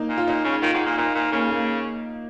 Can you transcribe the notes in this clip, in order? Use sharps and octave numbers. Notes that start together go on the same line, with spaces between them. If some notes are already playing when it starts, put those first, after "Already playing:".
Already playing: A#3 D#4
A#2
F4
A#2 D#4
C#3
D#3 F4
G#2
A#2
A#2 D#4
A#2
C#3 A#3
A#3